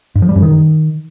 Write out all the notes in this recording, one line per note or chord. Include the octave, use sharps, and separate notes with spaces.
G2
F3
G3
F#2
D#3